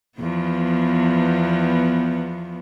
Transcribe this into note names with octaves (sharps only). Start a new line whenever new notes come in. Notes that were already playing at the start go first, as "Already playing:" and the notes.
E2 F3 B3